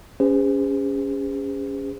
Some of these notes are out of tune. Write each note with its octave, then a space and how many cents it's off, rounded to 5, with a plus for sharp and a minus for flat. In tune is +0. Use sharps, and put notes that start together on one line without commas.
C#4 +15 G#4 -35 C5 -45